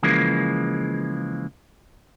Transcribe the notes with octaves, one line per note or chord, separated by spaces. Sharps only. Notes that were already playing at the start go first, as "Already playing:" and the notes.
C#3 E3 F3 G#3 A#3